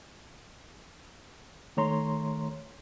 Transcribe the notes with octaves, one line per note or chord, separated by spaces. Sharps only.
D#3 A3 C#5 A#5 C6